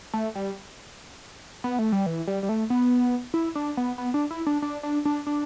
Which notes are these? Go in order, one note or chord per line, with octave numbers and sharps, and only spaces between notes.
A3
G3
B3
A3
G3
E3
G3
G3
A3
B3
E4
D4
B3
B3
D4
E4
D4
D4
D4
D4
D4